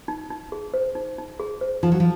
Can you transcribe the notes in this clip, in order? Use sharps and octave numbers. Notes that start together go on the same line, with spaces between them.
D#4
D#4
G#4
C5
D#4
D#4
G#4
C5
F3 D#4
F#3
F3